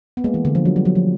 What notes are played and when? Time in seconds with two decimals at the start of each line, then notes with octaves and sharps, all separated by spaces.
0.17 B3
0.24 G#3 A#3
0.34 E3
0.45 D3
0.55 F3
0.65 F#3
0.76 G3
0.85 F#3
0.95 F3